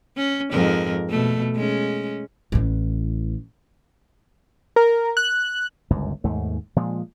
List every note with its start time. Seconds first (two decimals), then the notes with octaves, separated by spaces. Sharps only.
0.17 C#4
0.52 F2 G#2 A#4
1.10 B2 A3
1.56 G#3 C#4
2.52 A1 E3
4.76 A#4
5.17 F#6
5.90 G1 C#2 F#2
6.24 D#2 G#2 A3
6.76 A#2 F3 G#3